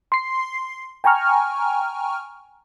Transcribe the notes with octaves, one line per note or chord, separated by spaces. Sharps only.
C6 C7
G5 G#5 A#5 C#6 F6